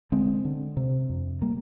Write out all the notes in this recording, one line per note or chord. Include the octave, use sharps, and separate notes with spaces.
D3 G#3 C4
D3
C3
F2
G3 A#3